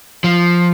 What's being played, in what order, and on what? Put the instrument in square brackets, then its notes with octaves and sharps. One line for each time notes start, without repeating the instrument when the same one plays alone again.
[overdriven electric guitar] F3